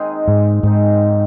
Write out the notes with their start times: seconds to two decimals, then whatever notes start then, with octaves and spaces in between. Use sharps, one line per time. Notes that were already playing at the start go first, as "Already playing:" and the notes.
Already playing: D#3 G#3 C4 D#4
0.28 G#2
0.63 G#2 D#3 G#3 C4 D#4